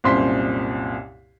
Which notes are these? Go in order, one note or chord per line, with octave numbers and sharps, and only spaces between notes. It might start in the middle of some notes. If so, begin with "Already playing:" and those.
C2 F#2 A#2 C5 C6 B6